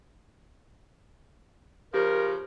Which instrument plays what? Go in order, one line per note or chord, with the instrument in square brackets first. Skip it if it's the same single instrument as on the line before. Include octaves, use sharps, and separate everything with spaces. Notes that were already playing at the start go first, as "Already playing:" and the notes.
[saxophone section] C#3 F3 [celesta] G4 [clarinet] A#4